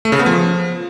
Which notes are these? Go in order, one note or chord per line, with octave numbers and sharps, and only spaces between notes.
A3
C#3
B3
F3